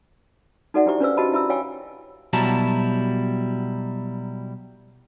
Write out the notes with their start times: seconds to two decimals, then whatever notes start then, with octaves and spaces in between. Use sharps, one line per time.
0.74 D#4 F#4 A4 D5 E5 F#5
0.86 D4 E4 G4 C5 E5 C#6
1.00 C#4 D4 B4 C5 F5 E6
1.17 F#4 G4 D#5 A5 B5
1.32 E4 E5 B5 E6
1.50 C#5 F5 G5 G#5 C#6
2.33 B2 F#3 G3 E4 A5 A#5